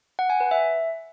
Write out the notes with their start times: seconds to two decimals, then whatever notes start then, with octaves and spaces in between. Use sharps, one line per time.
0.19 F#5
0.30 G#5
0.40 B4
0.51 E5